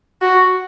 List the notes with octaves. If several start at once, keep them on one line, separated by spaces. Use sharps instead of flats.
F#4